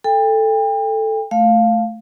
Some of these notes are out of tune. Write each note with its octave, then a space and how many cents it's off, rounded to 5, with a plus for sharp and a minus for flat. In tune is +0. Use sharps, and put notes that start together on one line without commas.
A4 +0 G5 +35
A3 -5 F5 +0